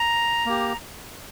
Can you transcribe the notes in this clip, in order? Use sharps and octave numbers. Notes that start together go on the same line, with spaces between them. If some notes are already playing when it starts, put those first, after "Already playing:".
Already playing: A#5
A#3 G4